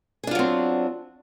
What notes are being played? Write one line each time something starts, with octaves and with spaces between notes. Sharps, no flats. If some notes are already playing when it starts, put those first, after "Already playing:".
F#3 C4 D4 F4 G#4